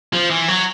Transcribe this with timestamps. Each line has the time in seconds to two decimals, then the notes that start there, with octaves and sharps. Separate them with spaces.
0.13 F3
0.30 E3
0.48 F#3